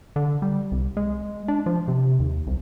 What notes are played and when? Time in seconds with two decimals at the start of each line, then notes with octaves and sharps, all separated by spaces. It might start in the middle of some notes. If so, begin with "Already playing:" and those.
0.16 D3
0.42 G3
0.72 C2
0.97 G#3
1.48 D4
1.66 F3
1.88 C3
2.20 D#2
2.47 C2